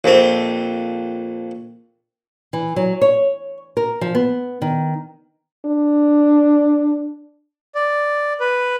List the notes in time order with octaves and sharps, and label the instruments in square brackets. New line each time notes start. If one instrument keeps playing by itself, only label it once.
[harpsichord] A#1 F2 C4
[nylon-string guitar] E3
F#3
C#5
A#4
F3
B3
D#3
[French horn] D4
[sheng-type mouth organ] D5
B4